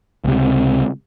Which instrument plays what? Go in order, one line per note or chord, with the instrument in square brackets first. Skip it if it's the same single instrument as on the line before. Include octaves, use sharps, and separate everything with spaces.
[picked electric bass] C#2 C3